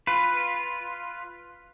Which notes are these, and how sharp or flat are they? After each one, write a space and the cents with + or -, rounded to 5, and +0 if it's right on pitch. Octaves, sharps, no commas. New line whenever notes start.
F4 +0 B4 +0